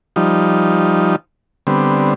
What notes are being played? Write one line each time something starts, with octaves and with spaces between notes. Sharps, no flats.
F3 G3 D#4
D3 G3 B3 C4